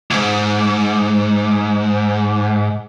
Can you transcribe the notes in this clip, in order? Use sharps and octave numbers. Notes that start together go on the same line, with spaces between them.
D2 G#2